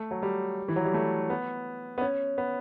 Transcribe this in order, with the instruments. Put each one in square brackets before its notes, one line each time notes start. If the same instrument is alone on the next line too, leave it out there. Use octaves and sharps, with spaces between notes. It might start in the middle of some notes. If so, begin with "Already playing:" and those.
Already playing: [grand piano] A3
F#3
G3
E3
F#3
G3
A3
B3
B3
C#4
B3